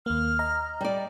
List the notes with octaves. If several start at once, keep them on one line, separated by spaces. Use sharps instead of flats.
D#2 A#3 F6
D#5 A#5
G3 D5